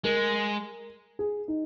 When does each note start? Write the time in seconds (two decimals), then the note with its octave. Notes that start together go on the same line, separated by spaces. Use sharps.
0.04 G#3 A#4
1.19 G#4
1.48 D#4